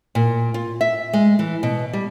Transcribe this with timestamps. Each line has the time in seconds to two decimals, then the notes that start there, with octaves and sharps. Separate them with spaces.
0.15 A#2
0.54 F4
0.81 E5
1.13 G#3
1.39 E3
1.63 B2
1.93 G3